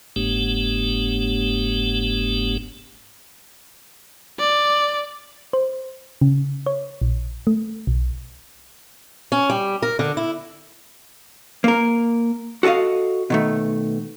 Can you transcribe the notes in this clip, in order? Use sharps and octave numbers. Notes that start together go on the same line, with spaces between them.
F#1 G#2 A3 B3 D4 G4
D5
C5
C#3
C#5
A#1
A3
B1
C#4
G3
A#4
D3
E4
A#3 A#4
F#4 A4 D5 D#5 F5
B2 D#3 A3